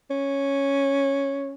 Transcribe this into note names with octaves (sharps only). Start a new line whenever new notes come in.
C#4